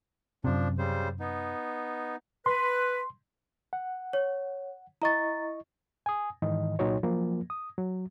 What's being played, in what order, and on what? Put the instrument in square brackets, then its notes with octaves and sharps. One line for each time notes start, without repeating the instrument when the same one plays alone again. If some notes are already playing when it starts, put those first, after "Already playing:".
[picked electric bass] F#2 C3 [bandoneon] F3 D4
[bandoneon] C#3 G3 C5
B3 D#4
[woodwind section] B4 [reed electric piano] C6
[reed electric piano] F#5
[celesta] C#5
[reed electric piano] E4 D#5 C#6 [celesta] A#5 A6
[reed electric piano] G#5 D#6
G#2 D#3 E3 D#5
C2 A#2 F#3 D#4 F#4 C#5
F3 F#3 A#3
D#6
F#3